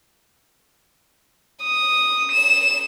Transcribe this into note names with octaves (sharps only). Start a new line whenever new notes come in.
D#6
E7